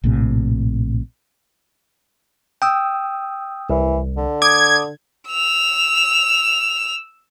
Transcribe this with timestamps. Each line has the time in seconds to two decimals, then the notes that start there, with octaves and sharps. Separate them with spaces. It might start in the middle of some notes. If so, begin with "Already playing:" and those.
0.04 A#1 A2 C3
2.62 G5 D#6 E6
3.70 C2 E3
4.17 D3
4.42 D6 D#6 G#6
5.28 E6 F7